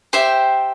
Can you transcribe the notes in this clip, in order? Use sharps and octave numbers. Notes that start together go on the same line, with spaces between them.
G4 C5 E5 G5